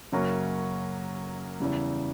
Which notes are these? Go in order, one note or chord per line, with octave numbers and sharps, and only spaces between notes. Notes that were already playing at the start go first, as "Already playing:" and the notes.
F#2 C#3 F#3 A#3 C#4
E2 C#3 G3